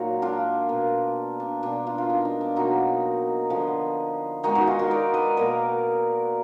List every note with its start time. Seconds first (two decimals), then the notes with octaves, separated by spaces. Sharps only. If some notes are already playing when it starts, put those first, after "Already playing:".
Already playing: A#2 F#3 A#3 D#4 F#4
0.22 D4 F4
0.69 B2 A#3
1.40 D4
1.63 B2 A#3 D4
1.87 D4 F4
1.98 F4
2.10 D#4
2.25 D4
2.41 D4
2.56 B2 F#3 A#3 D#4 F#4
3.49 D3 F3 B3
4.43 D#3 G#3 B3 D#4 F#4
4.55 D#4 F#4
4.67 F4 G#4
4.79 F#4 A#4
4.91 A#4 D5
5.14 B4 D#5
5.37 B2 A#3 A#4 D5